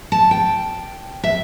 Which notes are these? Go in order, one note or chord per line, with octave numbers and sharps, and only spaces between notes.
A5
G5
E5